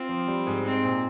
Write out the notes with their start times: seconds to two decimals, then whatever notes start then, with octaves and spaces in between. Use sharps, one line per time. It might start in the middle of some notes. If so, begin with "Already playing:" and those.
Already playing: C4 F4
0.09 F3
0.28 G3
0.47 G#2
0.65 C4 D#4
0.84 A#2